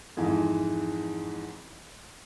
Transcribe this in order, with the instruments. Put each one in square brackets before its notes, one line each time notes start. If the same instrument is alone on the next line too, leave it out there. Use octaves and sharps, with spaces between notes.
[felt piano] F2 G#2 E3 G#3